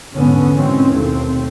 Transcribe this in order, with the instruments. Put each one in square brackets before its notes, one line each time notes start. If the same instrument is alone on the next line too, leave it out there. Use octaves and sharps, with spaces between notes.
[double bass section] E2 G#2 D3 B3 C#4
G#2 B2 D#3 E3 C4 C#4
D#2 B2 A3 C4